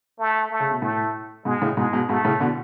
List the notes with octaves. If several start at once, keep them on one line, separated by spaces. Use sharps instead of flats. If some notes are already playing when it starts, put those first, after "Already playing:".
A3
A3
C#3
B2
A2 A3
G#2 B2 G#3
A2 C#3
G#2 B2 G#3
G#2 B2
G#2 B2 A3
A2 C#3
B2 D3